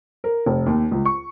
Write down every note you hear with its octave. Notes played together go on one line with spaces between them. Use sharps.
A#4
F1
D#2
C#2
C#6